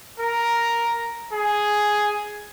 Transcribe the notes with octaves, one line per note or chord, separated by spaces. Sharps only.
A#4
G#4